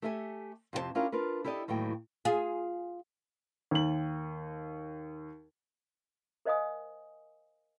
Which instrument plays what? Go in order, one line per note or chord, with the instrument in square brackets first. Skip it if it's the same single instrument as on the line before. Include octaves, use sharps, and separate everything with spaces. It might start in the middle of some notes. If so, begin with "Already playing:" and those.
[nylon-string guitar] A3 G4 A4 E5 F5 G#5
F2 C3 F#4 C5 A5
C#4 D4 E4 F4 G4 A#4
D4 F4 A#4 B4
E4 G4 A4 D5 D#5
D#2 A2 E3 F#3 G5
[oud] F4 G#4
[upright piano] D#2 F#7
[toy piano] A#4 C5 D#5 F5 G#5 D#6